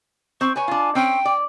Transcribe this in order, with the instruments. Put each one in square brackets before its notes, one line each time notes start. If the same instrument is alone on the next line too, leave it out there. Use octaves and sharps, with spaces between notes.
[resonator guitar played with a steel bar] C4 [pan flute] C#6
[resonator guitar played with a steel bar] B4 C#5 [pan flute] G#5
[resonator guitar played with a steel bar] D4 F4
[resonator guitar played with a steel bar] C4 C#4 [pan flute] G5
[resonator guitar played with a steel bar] D5